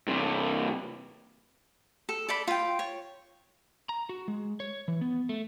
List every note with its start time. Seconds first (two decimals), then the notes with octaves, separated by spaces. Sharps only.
0.07 G2 C3
2.09 A4
2.29 A4 D5 B5
2.47 F4 G5
2.79 C#5
3.89 A#5
4.09 F#4
4.28 G#3
4.60 C#5
4.88 E3
5.01 B3
5.29 A3